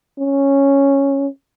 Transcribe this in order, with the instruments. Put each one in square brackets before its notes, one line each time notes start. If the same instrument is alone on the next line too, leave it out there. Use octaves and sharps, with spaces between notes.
[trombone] C#4